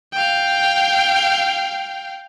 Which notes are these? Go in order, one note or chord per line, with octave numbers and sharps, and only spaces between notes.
F5 G5